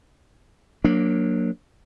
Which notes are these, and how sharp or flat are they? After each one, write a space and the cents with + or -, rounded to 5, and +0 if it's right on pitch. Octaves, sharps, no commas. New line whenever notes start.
F#3 -25 A#3 +0 D4 +0